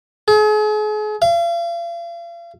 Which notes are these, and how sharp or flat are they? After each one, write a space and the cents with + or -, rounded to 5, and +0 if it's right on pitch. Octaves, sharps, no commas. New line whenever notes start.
G#4 +40
F5 -40